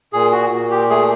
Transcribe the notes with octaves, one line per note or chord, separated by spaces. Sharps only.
A#2 G#4
F#4
A#2
G4
A3 G#4